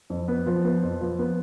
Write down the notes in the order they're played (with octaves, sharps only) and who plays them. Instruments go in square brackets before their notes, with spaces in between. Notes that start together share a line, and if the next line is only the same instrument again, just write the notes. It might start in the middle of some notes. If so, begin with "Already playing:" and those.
[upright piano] F2
B3
F3
B3
F2
F3
B3